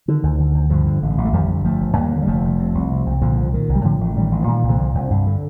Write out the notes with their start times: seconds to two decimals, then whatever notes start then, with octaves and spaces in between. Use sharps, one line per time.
0.08 D3 D#3
0.23 D2
0.40 D3
0.55 D2
0.70 G2 D3 F3
0.87 D3
1.02 A1
1.18 A1
1.25 A3
1.33 F2 D#3 G3
1.50 D3
1.64 G1 F3 A3
1.81 G1
1.96 D#2 G3 A#3
2.12 D3
2.22 G3
2.27 F1 F3 A3
2.44 F1
2.60 C3
2.75 C2
2.91 C3
3.06 C2
3.22 A#2 D3 F3
3.37 C2
3.53 A#2 D#3
3.69 C2
3.75 G3
3.84 A2 D3 F3
4.01 A1
4.16 A2 D#3 G3
4.32 A1
4.42 F3
4.47 A#2 D#3 G3
4.63 C2
4.68 D3 F3
4.78 A#2
4.95 C2
5.10 G2
5.27 D3